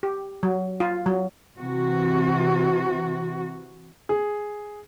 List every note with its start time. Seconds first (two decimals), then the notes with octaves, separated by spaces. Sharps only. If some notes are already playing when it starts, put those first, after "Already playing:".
0.03 G4
0.43 F#3
0.80 F4
1.06 F#3
1.59 C3 E3 F#4
4.09 G#4